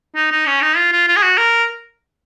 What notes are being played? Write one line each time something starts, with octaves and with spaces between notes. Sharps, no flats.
D#4
D#4
C#4
D#4
F4
F4
F4
G#4
F#4
A#4